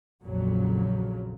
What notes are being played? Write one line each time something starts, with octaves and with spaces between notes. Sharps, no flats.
A#1 F2 A#2 C#3 F#3